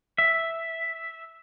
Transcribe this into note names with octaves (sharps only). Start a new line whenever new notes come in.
E5